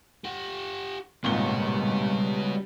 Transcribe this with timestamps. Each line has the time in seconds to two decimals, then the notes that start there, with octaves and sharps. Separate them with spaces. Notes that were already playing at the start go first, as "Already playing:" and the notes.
0.24 G4 F#5
1.24 G#1 C#2 A#2 G3 B3 F#4 G7